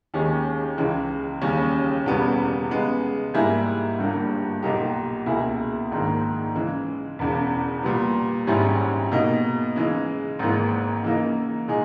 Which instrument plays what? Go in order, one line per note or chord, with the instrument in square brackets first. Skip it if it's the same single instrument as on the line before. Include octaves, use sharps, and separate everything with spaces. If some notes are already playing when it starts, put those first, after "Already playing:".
[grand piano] D#2 D#3 G#3 C#4 G4
C#2 C#3 E3 G#3
D#2 C#3 G3 C#4
E1 E2 C#3 G3 B3
C#3 G#3 B3
G#2 G3 A#3 E4 G#4
G1 G2 G3 A#3
B1 A#2 A#3 D#4 G4
C#2 B2 A#3 E4 G#4
A#1 G#2 D#3 A#3
C#3 E3 G#3
E1 E2 C#3
A#2 G3 B3
G#1 G#2 G3 C#4 E4
B2 A#3 D#4
C#3 E3 G#3 D#4
G#1 G#2 E3 A#3
C#3 E3 A#3 D#4
A#2 G#3 D#4 G#4